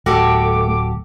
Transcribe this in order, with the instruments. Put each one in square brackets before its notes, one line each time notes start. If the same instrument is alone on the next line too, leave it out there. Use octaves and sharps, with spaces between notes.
[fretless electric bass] D1 [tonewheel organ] A3 [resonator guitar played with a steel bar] F#4 G4 A4 [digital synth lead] D6